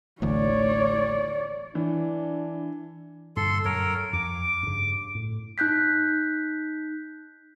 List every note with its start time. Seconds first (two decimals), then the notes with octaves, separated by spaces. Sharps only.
0.22 D1 A1 D2 C#5 D5
1.75 E3 D4
3.37 G2 A#2 D3 A4 C6
3.65 F#2 A4 A#4 C#5
4.13 F2 D6
4.63 G2 C#3
5.15 A2
5.58 D#4 F#6 G6 B6